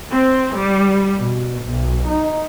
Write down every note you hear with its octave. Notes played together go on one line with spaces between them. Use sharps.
C4
G3
B2
B1
D#4